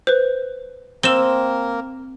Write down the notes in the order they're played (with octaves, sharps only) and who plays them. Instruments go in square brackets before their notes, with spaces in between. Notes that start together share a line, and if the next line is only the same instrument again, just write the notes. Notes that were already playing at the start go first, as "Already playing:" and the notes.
[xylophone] B4 C5
[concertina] A#3 A#4 [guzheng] C4 [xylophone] E6 E7 G7